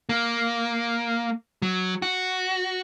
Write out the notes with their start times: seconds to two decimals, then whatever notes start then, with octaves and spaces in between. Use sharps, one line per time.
0.09 A#3
1.62 F#3
2.02 F#4